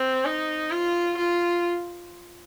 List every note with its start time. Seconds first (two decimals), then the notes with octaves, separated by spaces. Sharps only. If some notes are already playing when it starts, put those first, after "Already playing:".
Already playing: C4
0.25 D#4
0.71 F4
1.18 F4